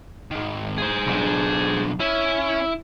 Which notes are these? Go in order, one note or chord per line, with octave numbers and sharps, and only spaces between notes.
G#2 D#3
G#4 C5
B1 D4
C#4 E4